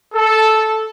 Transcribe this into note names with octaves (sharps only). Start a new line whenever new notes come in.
A4